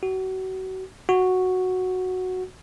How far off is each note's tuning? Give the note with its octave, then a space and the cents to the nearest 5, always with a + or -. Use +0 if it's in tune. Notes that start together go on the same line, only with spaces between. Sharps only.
F#4 +30
F#4 -5